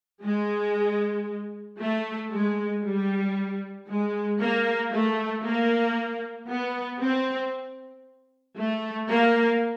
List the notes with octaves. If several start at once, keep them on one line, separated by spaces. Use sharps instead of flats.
G#3
A3
G#3
G3
G#3
A#3
A3
A#3
B3
C4
A3
A#3